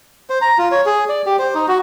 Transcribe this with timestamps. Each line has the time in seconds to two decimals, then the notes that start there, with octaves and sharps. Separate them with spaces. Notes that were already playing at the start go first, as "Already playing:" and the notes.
0.30 C5
0.42 A#5
0.58 F4
0.71 C#5
0.86 G#4
1.09 D5
1.26 G4
1.39 C5
1.55 D#4
1.68 F#4